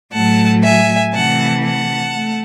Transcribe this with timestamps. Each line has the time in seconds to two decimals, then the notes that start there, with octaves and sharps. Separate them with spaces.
0.12 A2 F#3 A3 F#5 A5
0.63 E5 G#5
1.14 C3 E3 A3 F#5 A5
1.63 F#5 A5
2.14 A3